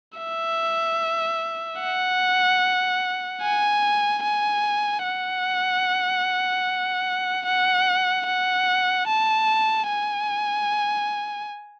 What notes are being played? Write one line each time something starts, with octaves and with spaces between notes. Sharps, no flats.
E5
F#5
G#5
G#5
F#5
F#5
F#5
A5
G#5